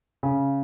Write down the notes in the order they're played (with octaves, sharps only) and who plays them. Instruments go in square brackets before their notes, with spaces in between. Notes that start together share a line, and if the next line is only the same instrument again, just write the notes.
[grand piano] C#3